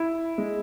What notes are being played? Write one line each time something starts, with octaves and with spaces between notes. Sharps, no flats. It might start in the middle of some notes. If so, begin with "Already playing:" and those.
Already playing: E4
G#3